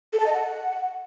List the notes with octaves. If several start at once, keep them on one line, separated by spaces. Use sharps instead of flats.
A4
A5
D#5
F#5